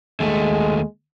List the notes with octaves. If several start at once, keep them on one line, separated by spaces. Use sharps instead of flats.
D#2 G#3 A3